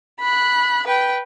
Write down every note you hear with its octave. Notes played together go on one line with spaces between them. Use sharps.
B5 F#6
B4 G5